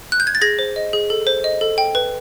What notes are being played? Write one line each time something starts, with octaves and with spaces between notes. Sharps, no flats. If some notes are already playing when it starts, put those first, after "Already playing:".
F#6
G6
G#6
A6
G#4 G#6 A#6
C5
D#5
G#4
A4
C5
D#5
A4
G5
B4